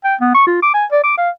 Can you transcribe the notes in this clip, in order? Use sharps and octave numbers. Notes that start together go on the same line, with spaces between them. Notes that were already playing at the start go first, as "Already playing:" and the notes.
G5
B3
C#6
F4
D6
G#5
D5
D6
F5